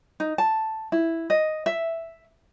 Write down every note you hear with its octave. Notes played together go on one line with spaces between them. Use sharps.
D#4
A5
E4
D#5
E5